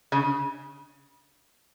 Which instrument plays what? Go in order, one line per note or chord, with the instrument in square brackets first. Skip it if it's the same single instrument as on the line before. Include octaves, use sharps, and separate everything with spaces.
[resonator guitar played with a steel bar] C#3